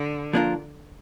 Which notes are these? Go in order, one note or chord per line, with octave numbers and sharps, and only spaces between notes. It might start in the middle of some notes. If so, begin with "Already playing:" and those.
Already playing: D3
F3 A#3 D4 F4 A#4